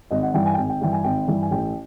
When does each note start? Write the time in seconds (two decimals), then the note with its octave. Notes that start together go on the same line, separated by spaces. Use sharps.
0.11 G#1 D#5
0.23 F#5
0.34 G2 E3 G5
0.46 G#5
0.54 G5
0.57 G#1 G#5
0.69 G5
0.81 G2 E3 G5
0.93 G#5
1.04 G#1 G5
1.28 G2 E3
1.43 G#5
1.51 A1 G5